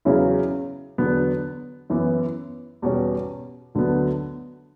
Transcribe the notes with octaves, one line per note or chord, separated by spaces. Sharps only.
E2 C#3 F#3 C#4 E4
E2 D3 F#3 B3
F#2 E3 B3
E2 B2 G3 C#4
D2 D3 F#3 B3